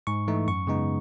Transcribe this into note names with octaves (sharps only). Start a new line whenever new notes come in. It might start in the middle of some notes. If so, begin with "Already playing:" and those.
G#2 C#6
E3 A3 D#4
F#2 C#6
C#3 G#3 B3 D#4